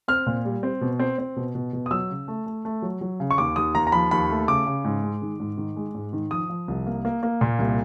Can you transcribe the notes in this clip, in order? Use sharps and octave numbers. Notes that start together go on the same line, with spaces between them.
C4 F6
A#2
G3
C4
B2
C4
C4
B2
B2
B2
D#6
F#3 E6
C#3
A3
A3
A3
F#3
F#3
C#3
C#6
D#2 D6
D#2 D#6
D#2 A#5
A#5
F3 B5
D#2 B5
A3
C#3 D6
C#3
G#2
G#3
D#3
G#2
D#3
G#3
G#2
D#3
F3 D#6
F3
C2
A#3
A#3
A#3
A#2
C2